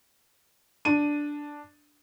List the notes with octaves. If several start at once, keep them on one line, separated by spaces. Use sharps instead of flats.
D4 D#7